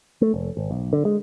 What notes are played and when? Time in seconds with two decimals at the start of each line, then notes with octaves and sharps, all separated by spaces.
0.21 A3
0.34 F1
0.57 G#1
0.71 B1
0.93 D3
1.05 G#3